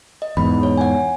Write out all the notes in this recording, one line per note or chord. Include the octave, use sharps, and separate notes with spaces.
D#5
E2 G#2 B5
C#5
F#5 G#5